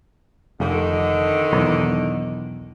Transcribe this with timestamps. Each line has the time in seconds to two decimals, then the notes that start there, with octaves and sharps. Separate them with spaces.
0.60 F1 D3 D#3
1.53 B1 E2